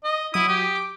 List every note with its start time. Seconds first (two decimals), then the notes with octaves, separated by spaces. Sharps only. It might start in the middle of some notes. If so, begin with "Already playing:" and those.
0.04 D#5
0.34 F#3 E4 D#6
0.48 G4
0.75 D6